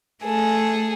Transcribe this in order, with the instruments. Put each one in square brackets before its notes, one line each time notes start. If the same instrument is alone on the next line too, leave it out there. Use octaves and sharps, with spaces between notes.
[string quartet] A3 G#4 A4